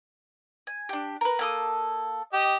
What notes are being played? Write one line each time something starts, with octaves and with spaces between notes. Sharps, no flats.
G#5
D4 G4
A#4 B4
A#3 A4 D#6
G4 D#5